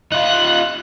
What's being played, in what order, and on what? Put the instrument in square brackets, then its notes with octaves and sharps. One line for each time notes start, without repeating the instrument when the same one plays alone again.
[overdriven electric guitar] D#4 F4 [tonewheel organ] F#6